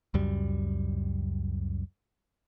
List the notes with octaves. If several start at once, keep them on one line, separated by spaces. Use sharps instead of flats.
C#2 F#2 G3